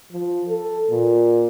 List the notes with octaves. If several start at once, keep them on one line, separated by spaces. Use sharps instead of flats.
F3
A4
A#2